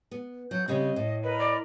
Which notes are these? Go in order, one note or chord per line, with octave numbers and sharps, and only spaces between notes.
B3
F#3 G6
C#3 G3 C4 D#5
A2
A#4 B4 D#5 B5
D5